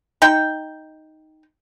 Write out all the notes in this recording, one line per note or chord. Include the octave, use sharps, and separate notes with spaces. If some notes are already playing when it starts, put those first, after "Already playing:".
D#4 G5